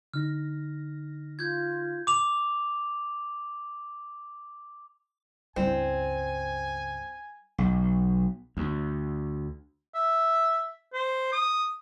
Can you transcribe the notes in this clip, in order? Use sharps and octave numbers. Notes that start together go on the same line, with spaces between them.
D3 D#4 F6 A#6
F4 G6 G#6
D6 F7
C#2 G2 G3 C4 E4 G#5
B1
D2
E5
C5
D#6